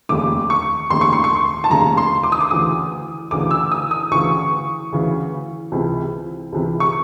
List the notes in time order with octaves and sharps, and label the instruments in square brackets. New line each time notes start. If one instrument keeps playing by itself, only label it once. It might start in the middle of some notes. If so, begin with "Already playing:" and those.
[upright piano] F1 D#2 C#3 D6
C#6
F1 D#2 C#3 C6
C#6
C6
C#6
C6
A5
F1 D#2 C#3 A#5
C6
D6
D#6
D6
D2 C#3 E3 D#6
D2 C#3 E3 D6
E6
D#6
D#6
D2 C#3 E3 C#6
D2 C#3 E3
C#2 C3 E3
C#2 C3 E3
C#6